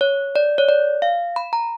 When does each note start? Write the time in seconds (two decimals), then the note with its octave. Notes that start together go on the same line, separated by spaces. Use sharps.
0.01 C#5
0.36 D5
0.58 C#5
0.69 D5
1.02 F5
1.36 B5
1.53 A#5